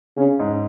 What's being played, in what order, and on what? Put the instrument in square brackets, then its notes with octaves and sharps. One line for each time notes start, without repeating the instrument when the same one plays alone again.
[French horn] C#3 [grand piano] C#4
[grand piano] G#2